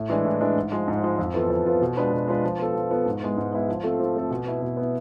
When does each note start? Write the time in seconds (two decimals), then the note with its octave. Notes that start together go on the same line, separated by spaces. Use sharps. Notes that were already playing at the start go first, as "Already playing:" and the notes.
Already playing: A2
0.10 E3 G#3 D4
0.25 A2
0.40 E3 G#3 D4
0.56 G#2
0.72 F3 G#3
0.88 G#2
1.04 F3 G#3
1.19 F2
1.34 E3 B3 F4 A4
1.50 F2
1.66 E3 B3 F4 A4
1.82 B2
1.97 G#3 D4 F4 B4
2.13 B2
2.28 G#3 D4 F4 B4
2.44 F3
2.58 B3 F4 A4
2.75 F3
2.91 B3 F4 A4
3.06 G#2
3.21 G#3 B3 E4
3.37 G#2
3.52 G#3 B3 E4
3.69 F3
3.83 A3 C4 F4 A4
3.99 F3
4.16 A3 C4 F4 A4
4.31 B2
4.46 B3 E4
4.62 B2
4.77 B3 E4